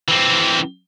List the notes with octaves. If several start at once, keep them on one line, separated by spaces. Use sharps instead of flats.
E3 C4